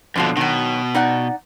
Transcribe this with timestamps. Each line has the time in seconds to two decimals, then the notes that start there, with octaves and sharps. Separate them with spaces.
0.16 F2 B2 D3 F3 F#3
0.37 B2 D#3 F#3
0.95 D#4 D5 F#5